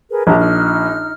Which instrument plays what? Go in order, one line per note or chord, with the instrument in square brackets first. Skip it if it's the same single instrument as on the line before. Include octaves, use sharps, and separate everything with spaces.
[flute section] G#4 A#4 B4
[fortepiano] A#1 [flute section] G4 A5 A#5
[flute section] D#4 F6